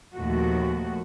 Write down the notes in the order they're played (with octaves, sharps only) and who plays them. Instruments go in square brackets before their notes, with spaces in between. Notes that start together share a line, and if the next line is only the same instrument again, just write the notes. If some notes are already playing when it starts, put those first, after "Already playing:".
[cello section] D#2 A#2 F3 A3 F#4